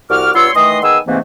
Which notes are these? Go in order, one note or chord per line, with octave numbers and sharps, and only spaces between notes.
C2 F#4 D6 F6
G2 B3 F4 C#5 C6 E6
D#3 E3 A3 D#5 C6 D#6
D#3 B3 G#4 G#5 E6
G#2 C3 E3 A3 A#3 C4